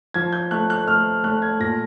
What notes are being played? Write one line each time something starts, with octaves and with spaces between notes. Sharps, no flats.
F3 G#6
G6
A3 F#6
F#6
A3 F6
A3 F#6
G#6
A#2 A#6